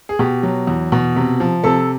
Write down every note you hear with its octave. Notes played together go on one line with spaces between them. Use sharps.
G#4
B2 G4
F#3
E2
B2
C3
F3
C3 A4